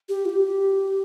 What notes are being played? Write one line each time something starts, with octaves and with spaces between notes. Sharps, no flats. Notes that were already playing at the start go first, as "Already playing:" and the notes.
G4
F4
G4